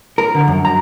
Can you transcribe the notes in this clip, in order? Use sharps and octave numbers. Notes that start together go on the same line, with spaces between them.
A#4
D3
F#2
A#5